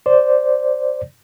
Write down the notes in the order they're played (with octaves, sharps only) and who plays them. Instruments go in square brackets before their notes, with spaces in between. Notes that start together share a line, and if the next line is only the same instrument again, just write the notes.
[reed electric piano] C5 D5